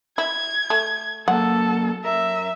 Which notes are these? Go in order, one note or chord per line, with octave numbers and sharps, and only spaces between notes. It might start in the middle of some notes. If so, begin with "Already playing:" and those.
E4 G#6
A3
F#3 A#3 A4 F#5
F#2 A#4 E5